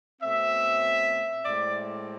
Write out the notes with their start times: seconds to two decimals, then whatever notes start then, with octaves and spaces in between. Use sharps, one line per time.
0.22 B2 A3 C4 E5
1.45 A2 G#3 C4 D5